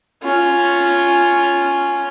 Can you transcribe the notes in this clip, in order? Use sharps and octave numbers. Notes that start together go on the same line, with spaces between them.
C#4 F4